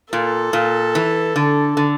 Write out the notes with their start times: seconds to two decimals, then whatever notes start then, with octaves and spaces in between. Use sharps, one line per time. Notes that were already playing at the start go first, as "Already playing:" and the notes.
0.13 A#2 A4
0.53 A#2
0.95 E3
1.36 D3
1.77 D3